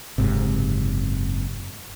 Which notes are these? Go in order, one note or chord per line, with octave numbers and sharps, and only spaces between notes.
F#1 G#2 C3